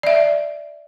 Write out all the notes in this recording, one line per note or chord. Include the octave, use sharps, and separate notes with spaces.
D5 E5